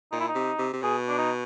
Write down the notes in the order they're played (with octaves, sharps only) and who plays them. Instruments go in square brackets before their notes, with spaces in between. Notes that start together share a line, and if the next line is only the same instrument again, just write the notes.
[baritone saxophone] A#2 [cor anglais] D#4
[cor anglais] E4
D#4
[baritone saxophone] C3
C3
C3
[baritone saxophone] B2 [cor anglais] G#4
[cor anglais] D4
D#4